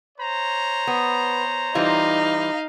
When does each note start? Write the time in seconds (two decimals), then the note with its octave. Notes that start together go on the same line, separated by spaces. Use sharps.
0.18 C5 C#5 A#5
0.87 B3
1.75 E3 G3 D#4 F4 F5